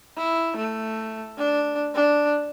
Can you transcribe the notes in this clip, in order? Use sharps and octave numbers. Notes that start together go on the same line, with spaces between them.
E4
A3
D4
D4